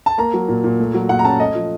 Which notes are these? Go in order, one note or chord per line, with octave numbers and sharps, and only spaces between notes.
A5
A#3 A#5
F#3
A#2
A#2
A3
F#3
A#2 F#5
A#5
C#4 A5
A3 D#5
F3